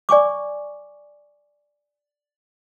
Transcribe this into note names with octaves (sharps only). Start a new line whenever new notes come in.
D5 G#5 C#6 D6